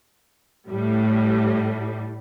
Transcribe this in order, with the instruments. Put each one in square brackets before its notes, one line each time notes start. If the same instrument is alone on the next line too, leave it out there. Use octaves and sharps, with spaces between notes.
[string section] A2 G3